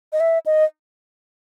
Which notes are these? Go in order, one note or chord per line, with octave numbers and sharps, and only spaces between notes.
D#5
E5
D#5